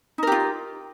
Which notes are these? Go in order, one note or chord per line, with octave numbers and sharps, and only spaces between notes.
D#4 F4 G4 A#4